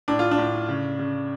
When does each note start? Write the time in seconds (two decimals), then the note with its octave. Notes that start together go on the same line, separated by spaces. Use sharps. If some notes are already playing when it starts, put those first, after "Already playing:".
0.08 A2 D4
0.19 F4
0.31 D4
0.38 A2
0.68 C#3
0.99 C#3